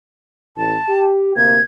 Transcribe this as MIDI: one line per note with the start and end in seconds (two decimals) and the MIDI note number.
0.56 0.76 33
0.56 1.05 81
0.89 1.32 67
1.36 1.58 38
1.36 1.58 48
1.36 1.58 58
1.36 1.61 92